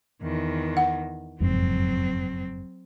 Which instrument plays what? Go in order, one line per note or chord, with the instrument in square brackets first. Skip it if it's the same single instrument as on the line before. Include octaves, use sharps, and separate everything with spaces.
[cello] E2 D#3
[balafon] F#5
[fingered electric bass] F#1 F2 G#2 [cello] F#3 C4